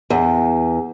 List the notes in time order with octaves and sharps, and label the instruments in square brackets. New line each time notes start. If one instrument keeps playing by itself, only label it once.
[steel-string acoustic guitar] E2